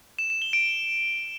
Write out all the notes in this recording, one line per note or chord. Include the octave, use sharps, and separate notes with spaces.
E7
E7
G7
D7